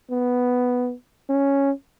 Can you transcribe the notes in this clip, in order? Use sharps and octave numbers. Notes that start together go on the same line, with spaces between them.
B3
C#4